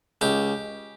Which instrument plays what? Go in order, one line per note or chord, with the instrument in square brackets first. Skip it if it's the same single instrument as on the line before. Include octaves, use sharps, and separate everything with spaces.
[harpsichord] C#2 G4